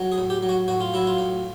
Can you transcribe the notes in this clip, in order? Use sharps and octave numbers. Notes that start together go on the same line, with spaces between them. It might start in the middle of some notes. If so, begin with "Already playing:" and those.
Already playing: F#3
G#4
A2
G4
F#3
F#4
A2 F#4
F4
F#3 E4
F4
A2